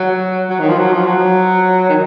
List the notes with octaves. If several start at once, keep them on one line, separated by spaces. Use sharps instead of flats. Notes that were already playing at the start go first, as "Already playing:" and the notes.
Already playing: F#3
F#3
D#3
F3
F#3
F3
F#3
D#3